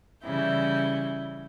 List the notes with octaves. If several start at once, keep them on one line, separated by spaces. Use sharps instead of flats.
C#3 E3 G3 E4 G6